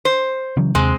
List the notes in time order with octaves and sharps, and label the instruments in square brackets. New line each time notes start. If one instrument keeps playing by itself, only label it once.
[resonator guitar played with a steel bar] C5
[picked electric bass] C#3 E3 F#3
[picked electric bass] D#2 C3 [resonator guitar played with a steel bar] G#3 C4